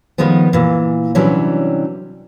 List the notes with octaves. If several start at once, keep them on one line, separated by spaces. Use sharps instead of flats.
D#3 F3 G3 G#3 B3
A#2 E3
C3 E3 F#3 G3 C#4 D4